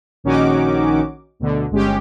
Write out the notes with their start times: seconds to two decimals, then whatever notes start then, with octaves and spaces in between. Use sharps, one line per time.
0.24 A#1 D#3 C#4 D#4 F#4 D6
1.40 D2 B2 D3
1.70 G1 G#3 C#4 G4